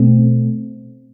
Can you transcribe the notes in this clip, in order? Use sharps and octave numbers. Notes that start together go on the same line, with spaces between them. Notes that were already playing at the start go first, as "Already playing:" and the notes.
Already playing: B2 A3 C4